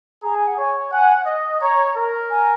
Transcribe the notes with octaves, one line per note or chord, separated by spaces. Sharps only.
G#4 A#5
G#5
F#5
C#5 G#5
F#5 G#5
D#5
C#5 A#5
A#4
G#5